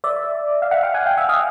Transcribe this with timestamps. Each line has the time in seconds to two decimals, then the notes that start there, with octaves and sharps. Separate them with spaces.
0.04 D5 E5
0.62 F5
0.71 E5 F#5
0.83 F5 G5
0.94 F#5 G#5
1.06 F5 G5
1.17 E5 F#5
1.29 D#5 F5